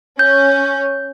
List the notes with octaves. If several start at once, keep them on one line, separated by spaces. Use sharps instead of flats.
C#4 G6